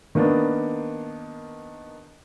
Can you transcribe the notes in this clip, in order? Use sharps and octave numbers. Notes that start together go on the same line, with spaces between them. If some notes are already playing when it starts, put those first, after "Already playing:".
D#3 A#3 B3 D4